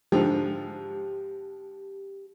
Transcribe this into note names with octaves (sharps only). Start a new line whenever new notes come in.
G#2 D3 F3 G4